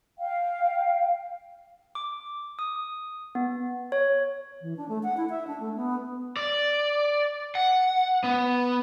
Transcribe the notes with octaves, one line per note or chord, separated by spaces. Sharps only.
F5 G5
D6
D#6
B3
C#5
E3
D4
A3
F#5
E4
E5
D4
A3
B3
D5
F#5
B3